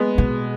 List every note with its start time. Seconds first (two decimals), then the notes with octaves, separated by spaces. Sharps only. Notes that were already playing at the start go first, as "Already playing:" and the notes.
Already playing: G#3 B3
0.18 B2